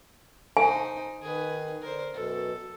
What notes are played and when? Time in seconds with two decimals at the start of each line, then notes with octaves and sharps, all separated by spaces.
0.57 D#4 C5 G#5
1.22 D#3 G#4 B4
1.82 D3 A#4 C5
2.14 F#2 B2 A4